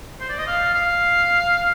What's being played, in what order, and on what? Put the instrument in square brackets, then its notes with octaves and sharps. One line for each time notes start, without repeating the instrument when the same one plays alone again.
[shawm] C5
D5
D#5
F5
F5